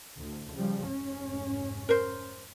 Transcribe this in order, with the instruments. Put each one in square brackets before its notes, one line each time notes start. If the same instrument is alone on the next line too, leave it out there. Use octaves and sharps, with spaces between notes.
[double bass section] D2 A2
C#3 F3 G3
F1 G#2 C#4
[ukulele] A#4 C5